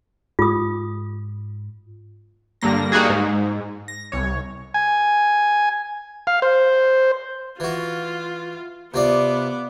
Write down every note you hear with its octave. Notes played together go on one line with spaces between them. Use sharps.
G#2 F4 D#6
G2 D3 A#3 A#6
G3 A#3 D#4 F#4 G#4
G#2
A#6
C2 C#5
G#5
F5
C5
E3 F4 F#4
C3 B3 F4 D5 D6